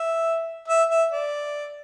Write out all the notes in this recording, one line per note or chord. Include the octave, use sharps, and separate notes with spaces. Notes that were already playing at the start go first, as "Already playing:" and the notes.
Already playing: E5
E5
E5
D5